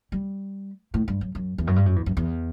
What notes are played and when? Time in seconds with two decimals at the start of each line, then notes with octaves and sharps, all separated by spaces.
0.12 G3
0.94 A2
1.08 G2
1.21 F#2
1.35 F#2
1.58 E2
1.67 F#2
1.76 G2
1.86 F#2
1.96 E2
2.06 F#2
2.17 E2